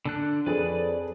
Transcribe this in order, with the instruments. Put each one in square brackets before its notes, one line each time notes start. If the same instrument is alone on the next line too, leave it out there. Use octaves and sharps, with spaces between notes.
[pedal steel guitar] D3 D4 F#6
[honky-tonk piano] F2 G#4 [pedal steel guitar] B4 D5